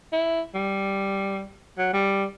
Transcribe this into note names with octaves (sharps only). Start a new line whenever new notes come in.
E4
G3
F#3
G3